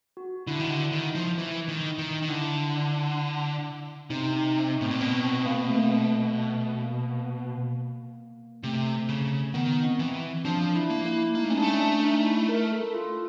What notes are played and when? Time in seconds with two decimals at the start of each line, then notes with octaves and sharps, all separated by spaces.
0.17 F#4
0.47 D3 E4
0.60 D#3
0.70 D3
0.92 D#3
1.15 F3
1.38 E3
1.69 D#3
1.99 D#3
2.22 D#3
2.29 D3 E4
4.10 C3 D#4
4.33 D#4
4.78 A2 C4
4.91 A#2
5.01 B2 C4
5.24 C4
5.46 A#3
5.69 A3
6.82 A#3
8.63 C3 A3
9.09 C#3
9.54 D#3 B3
9.84 C4
9.99 E3
10.45 F3 D4
10.75 E4
10.90 A#3
11.06 E4
11.35 A#3 D#4
11.44 A3
11.50 C#4
11.53 G#3
11.58 A3 D4
11.81 D4
12.04 D#4
12.27 E4
12.49 A#4
12.72 A4
12.94 F4